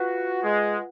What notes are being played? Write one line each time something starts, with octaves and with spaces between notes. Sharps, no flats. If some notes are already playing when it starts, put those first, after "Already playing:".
Already playing: F4 F#4 B4 F#5
G#3